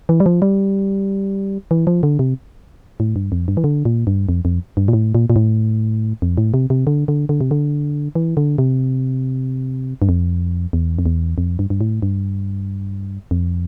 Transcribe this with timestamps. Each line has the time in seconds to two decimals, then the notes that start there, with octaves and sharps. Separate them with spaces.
0.09 E3
0.20 G3
0.26 F3
0.42 G3
1.71 E3
1.87 F3
2.03 D3
2.19 C3
3.00 A2
3.16 G2
3.32 F2
3.48 G2
3.57 E3
3.64 D3
3.85 A#2
4.07 G2
4.29 F2
4.45 F2
4.77 G2
4.88 A#2
4.93 A2
5.15 A#2
5.30 A#2
5.36 A2
6.22 F2
6.38 A2
6.54 C3
6.70 C3
6.87 D3
7.08 D3
7.29 D3
7.41 C3
7.51 D3
8.15 E3
8.37 D3
8.58 C3
10.02 G2
10.09 F2
10.73 E2
10.99 F2
11.06 E2
11.38 F2
11.59 G2
11.70 G2
11.81 A2
12.02 G2
13.31 F2